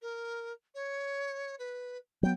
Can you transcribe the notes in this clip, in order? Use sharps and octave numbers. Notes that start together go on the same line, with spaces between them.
A#4
C#5
B4
F#3 B3 G5